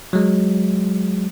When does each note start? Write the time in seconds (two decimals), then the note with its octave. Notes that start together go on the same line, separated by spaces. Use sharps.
0.13 F#3 G#3